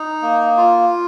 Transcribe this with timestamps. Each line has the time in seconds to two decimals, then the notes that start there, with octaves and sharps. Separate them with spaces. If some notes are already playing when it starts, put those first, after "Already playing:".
Already playing: D#4
0.22 A#3
0.57 F4